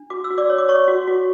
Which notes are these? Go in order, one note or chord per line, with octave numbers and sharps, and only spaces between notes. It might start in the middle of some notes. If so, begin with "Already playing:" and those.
Already playing: D4
F#4 D6
E6
F#4
D5 D6
C#5
D6
C#5 C#6
F#4
F#4